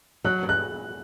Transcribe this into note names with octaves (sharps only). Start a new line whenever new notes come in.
F#3 F#6
G2
F#6